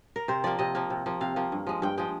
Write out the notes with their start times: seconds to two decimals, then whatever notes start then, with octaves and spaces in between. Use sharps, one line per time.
0.16 A#4
0.28 C3 C5
0.44 F3 A#3 D5
0.59 C3 D#5
0.75 F3 A#3
0.90 C3
1.06 F3 A#3
1.21 C3 F5
1.36 F3 A#3
1.52 G2
1.67 F3 G#3
1.82 G2 G5
1.98 F3 G#3 G5